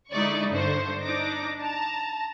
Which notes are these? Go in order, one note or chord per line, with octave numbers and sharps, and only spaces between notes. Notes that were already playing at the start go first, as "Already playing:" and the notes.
D3 G#3 D#4 E4 D5 C#6
G2 D3 C5 C#6
D4 D#4 D6 A#6
A5 A#5